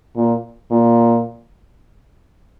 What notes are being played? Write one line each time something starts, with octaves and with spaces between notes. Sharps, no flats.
A#2
A#2